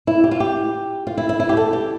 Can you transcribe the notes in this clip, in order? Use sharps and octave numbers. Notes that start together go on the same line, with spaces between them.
E4
G4
F4
G4
F4
E4
E4
E4
G4
A4
G4